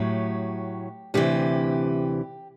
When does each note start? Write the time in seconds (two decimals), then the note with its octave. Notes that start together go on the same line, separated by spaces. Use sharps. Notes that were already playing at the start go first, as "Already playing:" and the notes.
Already playing: A2 F#3 G4
1.14 D2 C3 E3 G4